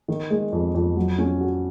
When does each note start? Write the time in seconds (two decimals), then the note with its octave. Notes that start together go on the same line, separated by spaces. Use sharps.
0.08 D#3
0.30 G#3
0.52 F2
0.74 F2
0.96 F#3
1.18 C#4
1.41 F#4